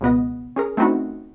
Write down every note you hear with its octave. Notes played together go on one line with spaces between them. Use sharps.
C#2 B2 B3 D#5
C#4 G#4 A#4
A3 C4 C#4 D#4 E4 F#4